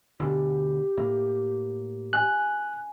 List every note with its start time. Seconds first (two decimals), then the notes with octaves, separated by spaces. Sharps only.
0.20 D2 B2 D3 G4
0.97 A2 A#3
2.13 G#5 F#6